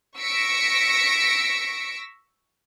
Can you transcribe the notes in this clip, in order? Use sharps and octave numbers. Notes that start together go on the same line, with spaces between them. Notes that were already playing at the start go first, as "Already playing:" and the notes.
C#6 E6 A#6 B6 C#7 D7